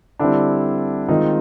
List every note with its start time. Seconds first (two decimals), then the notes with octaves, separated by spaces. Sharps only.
0.19 D3 G3 C4 D4 E4
1.09 D#3 G#3 C4 D#4 F4